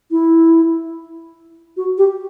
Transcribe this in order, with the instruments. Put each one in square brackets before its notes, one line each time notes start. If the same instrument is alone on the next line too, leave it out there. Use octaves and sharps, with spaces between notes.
[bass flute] E4
F#4
G4